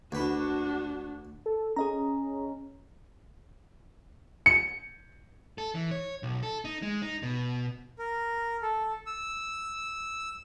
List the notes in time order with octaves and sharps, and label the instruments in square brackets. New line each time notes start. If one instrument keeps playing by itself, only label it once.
[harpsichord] D2 B4 [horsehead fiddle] D4 F#4
[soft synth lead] A4
[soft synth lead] C#4 [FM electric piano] G#4 D#5 A#5
[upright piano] C#7
[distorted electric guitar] A4
E3
C#5
B1
A4
D#4
G#3
D#4
B2
[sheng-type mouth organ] A#4
A4
E6